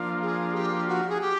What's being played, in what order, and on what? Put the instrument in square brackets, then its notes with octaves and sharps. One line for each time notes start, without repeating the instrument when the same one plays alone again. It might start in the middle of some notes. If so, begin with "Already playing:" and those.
Already playing: [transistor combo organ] F3 A#3 D4 F4
[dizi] G#4
G4
F#4
G#4
G4